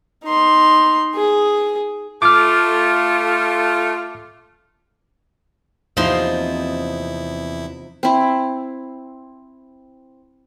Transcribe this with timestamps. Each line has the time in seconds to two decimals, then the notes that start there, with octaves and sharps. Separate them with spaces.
0.24 D#4 C6
1.15 G#4
2.22 A3 F4 D6 F6
5.97 E2 C3 F3 A#3 D#4 E4 C6
8.03 C4 E4